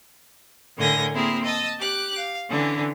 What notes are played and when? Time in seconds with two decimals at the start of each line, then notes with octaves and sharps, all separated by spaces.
0.77 A2 D3 A#4 G#5 G6 A#6
1.14 A#3 C4 E4 G#4 A#4
1.45 D#5 A5 D#6 E6
1.78 G4 D6 F#6
2.16 F5
2.49 D3 E3 C#4 D4